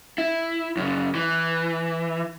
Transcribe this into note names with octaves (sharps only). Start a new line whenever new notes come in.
E4
F#2 C#3
E3